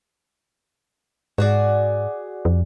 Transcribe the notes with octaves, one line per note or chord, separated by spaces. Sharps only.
G#2 F#4 G#4 D5
F2